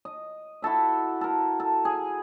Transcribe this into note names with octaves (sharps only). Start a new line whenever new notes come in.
D#5
E4 F#4 A4 E5
A4 A#4
A4
G#4